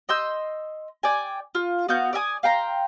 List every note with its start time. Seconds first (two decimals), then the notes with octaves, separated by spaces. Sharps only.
0.09 D#5 C6 E6 G6
1.03 D5 G5 G#5
1.55 F4
1.89 B3 F#4 F5 G6
2.13 D5 E5 G#5 D#6
2.43 F5 G5 A#5 C6